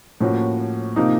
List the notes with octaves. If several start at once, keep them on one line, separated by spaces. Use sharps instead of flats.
A2 F3 A#3 C#4 F#4
C3 F3 A#3 D#4